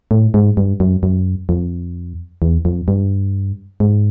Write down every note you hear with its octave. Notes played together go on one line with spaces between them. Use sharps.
A2
G#2
G2
F#2
F#2
F2
E2
F2
G2
G#2